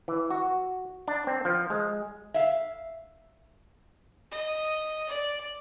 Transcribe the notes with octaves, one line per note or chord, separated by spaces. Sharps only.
E3
F#4
D4
C4
F3
G#3
E5 F5
D#5
D5